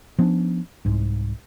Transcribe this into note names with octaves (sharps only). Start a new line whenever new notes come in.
F3 B3 C#4 D4
C2 G#2